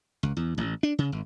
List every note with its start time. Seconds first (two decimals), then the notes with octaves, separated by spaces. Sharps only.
0.23 C#2
0.37 E2
0.58 A1
0.83 D4
0.98 C#3
1.12 G#1